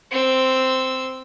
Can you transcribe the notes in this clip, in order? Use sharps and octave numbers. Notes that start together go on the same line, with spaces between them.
C4 E6